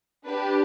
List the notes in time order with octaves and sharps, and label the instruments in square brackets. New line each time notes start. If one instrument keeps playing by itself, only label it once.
[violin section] D4 G4 B4